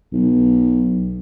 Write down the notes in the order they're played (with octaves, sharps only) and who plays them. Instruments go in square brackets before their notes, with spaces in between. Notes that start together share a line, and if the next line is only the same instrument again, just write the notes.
[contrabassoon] B1